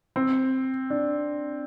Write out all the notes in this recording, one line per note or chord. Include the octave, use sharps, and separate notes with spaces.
C4
D4